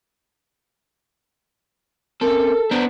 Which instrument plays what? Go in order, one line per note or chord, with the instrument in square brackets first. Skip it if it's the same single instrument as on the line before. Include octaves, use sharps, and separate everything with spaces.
[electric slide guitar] C4 C#4 [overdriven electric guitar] A4 [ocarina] A#4
[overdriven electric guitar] B3 D4 [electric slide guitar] B4 C5 A#5